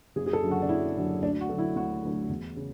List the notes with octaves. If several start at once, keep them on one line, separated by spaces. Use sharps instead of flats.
F#1 G#4
G#4
A4
F#2 D3 F#3
F#4
D4
F#1 E4
F#2 D3 F#3
D2 D4
F#4
D3 F#3 A3
E4
D2 F#4
D3 F#3 A3
E2
C#3